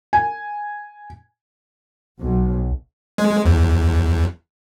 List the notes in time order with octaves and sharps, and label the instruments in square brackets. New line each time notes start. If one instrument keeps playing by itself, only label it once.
[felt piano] G#5
[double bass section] B1
[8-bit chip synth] G#3
E2